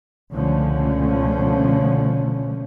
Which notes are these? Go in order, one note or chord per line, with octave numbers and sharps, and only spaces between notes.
C#2 B2 D3 F3 A3 C#4